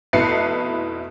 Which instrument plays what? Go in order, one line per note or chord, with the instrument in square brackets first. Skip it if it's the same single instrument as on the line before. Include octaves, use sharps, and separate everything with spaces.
[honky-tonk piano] F1 B2 E4 B4 C7 C#7